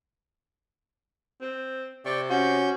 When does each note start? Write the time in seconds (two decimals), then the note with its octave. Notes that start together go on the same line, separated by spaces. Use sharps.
1.41 C4
2.06 C3 D5 G5 C#6
2.31 C#4 F#4 G6